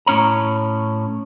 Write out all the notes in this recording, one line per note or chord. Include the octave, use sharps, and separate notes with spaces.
A2 C#4 C#5 A#5